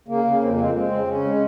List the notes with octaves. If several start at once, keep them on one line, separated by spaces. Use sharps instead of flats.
C#3 A#3
C#3
F2 C4
A#3
G#3 C4
G#3 C4
C#3
C#3 C#4
G#3